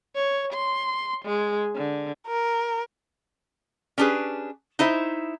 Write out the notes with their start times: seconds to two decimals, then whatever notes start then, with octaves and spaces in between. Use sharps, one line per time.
0.16 C#5
0.53 C6
1.26 G#3
1.76 D3
2.27 A#4
3.98 C#4 D4 G4 G#4 B4
4.79 D#4 E4 C5 E5